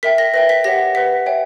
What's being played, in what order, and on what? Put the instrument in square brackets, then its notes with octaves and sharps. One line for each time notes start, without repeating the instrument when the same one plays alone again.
[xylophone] A#4 E5 G5 B6
A#6
B4 E5 G5 A#6
B6
G4 C#5 F#5 A#6
B4 F#5 B6
C#5 E5 G5